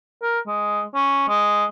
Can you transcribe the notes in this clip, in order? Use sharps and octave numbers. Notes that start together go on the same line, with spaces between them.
A#4
G#3
C#4
G#3